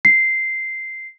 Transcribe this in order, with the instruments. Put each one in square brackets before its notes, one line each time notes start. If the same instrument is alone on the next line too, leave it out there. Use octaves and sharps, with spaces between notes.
[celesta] C7